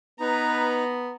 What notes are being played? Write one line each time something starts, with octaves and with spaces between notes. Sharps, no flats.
B3 D#4 B4 A#5